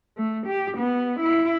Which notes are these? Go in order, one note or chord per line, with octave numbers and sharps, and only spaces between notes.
A3
G4
B3
E4